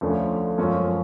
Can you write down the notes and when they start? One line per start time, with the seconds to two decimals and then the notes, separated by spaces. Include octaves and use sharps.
0.01 D2 D3 F3 A3 C#4
0.58 F#2 F3 G#3 C#4 F4